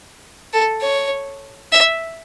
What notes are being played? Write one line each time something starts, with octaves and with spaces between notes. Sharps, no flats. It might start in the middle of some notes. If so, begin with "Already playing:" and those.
A4
C#5
E5